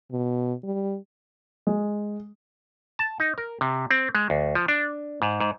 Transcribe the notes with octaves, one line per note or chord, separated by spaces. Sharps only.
B2
G3
G#3
A5
D#4
A#4
C3
C4
G#3
D2
F3
D4
G#2
G#2